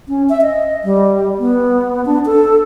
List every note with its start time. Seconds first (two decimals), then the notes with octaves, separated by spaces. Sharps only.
0.09 C#4
0.29 E5
0.42 D#5
0.84 G3
1.39 B3
2.05 D4
2.26 A4